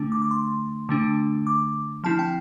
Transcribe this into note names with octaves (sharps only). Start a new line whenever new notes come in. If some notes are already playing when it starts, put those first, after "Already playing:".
Already playing: D3 A3 D4
D6
D6
C6
D3 A3 D4
D6
F3 C4 E4 A5
G5